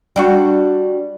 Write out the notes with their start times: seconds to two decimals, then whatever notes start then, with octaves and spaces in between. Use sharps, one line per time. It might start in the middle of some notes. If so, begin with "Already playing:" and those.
0.16 G3 D4 F#4